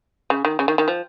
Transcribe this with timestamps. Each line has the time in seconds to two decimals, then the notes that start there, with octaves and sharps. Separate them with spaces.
0.30 C#3
0.45 D#3
0.59 C#3
0.68 D#3
0.78 D#3
0.88 F3